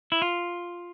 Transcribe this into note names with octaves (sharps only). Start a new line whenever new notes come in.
E4
F4